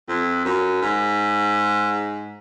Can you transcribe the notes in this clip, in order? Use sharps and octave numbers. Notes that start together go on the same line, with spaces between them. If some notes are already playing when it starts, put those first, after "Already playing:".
F2
F#2
G#2